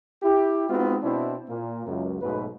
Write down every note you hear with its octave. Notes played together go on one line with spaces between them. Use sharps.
E4 G4
G#3 B3 C4 D#4 F4 F#4
B2 C4 D4 E4
A#2 A#3
C#2 F#2
B1 G#2 B2 A3 B4